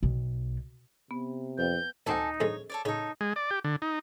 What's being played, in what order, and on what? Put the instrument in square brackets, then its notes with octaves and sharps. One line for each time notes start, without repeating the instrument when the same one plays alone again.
[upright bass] B1
[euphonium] C3 [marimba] B3
[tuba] F2 [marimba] B4 F5 G5 [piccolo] G6
[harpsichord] D2 C4 F#5 [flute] D#4 [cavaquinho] A4 D5 G#5
[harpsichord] F2 D3 G#3 [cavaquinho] C#5
[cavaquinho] A4 C#5 D5
[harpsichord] C#3 [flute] D#4 [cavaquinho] A4 C#5
[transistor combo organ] G#3
D5
G4
D3
D#4